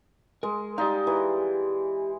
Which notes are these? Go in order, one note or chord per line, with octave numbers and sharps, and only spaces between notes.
G#3 A#4
D#4 G4 D5 F5
E3